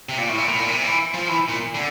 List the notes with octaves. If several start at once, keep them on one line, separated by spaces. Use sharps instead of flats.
C3
A#2
A2
A#2
A2
A#2
C3
E3
F3
E3
A#2
D3